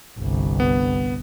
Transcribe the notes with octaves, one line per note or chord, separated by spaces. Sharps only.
G1 C2
B3